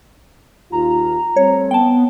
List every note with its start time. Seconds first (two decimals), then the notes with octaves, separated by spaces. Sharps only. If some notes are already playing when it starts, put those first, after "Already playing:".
0.72 D#2 F4 A#5
1.36 G3 A3 C4 C#5
1.71 B3 G5 A5